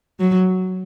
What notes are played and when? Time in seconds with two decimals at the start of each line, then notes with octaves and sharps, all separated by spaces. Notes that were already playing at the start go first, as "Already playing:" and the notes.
0.20 F#3